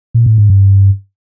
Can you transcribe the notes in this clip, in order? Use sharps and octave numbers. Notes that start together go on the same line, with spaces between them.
A#2
A2
G#2
G2